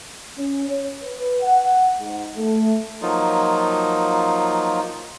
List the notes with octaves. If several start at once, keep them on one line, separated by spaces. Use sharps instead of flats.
C#4
C#5
B4
F#5
G#2
A3
F3 F#3 A#3 D#4 F4